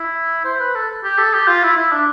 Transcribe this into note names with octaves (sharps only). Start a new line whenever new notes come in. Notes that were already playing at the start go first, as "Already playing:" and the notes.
Already playing: E4
C5
B4
A4
G4
A4
G4
F4
E4
E4
D4